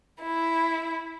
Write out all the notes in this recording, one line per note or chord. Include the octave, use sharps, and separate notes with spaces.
E4